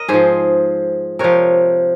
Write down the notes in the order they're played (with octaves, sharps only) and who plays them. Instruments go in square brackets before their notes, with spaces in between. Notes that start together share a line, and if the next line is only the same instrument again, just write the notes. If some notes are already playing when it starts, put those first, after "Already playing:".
Already playing: [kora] A#4 D#5
G#2 F3 G#4 C5
C3 F3 A#4 C#5